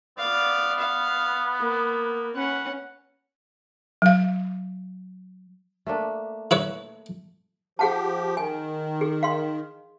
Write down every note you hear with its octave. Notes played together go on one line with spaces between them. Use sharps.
B3 D5 F5
F5
A#3
C#4 B4 F#5
F#3 F5
A3 A#3 D4
E4 B4 C#5
F3 G4 G#4 F#5 A5
D#3 G#5
G#4
F5 C6